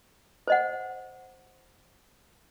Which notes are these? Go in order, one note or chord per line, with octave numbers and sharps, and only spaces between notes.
C5 D#5 F#5